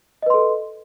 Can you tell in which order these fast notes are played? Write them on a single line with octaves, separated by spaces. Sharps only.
D#5 B4 C6 A4